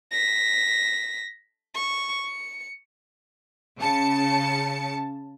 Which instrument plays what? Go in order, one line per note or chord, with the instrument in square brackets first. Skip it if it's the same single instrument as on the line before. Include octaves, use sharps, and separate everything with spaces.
[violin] A#6 B6
C#6
C#7
[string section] C#3 A5 C#7